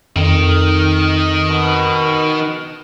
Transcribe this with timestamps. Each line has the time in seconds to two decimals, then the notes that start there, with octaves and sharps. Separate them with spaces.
0.16 F2 D#3
1.49 B2